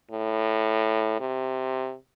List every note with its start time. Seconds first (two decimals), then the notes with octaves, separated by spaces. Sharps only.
0.11 A2
1.20 C3